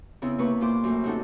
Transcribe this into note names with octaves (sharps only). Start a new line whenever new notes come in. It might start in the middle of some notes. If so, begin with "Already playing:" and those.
C#3 B3 C4 E4
C3 A#3 B4 C#6
A#2 F4 C5 D6
F#2 A2
C3 C#4 D#4 F#4 A4